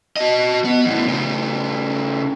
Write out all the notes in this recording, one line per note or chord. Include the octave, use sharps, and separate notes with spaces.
F#4 D#5
B3
E2 A2
C#3 A3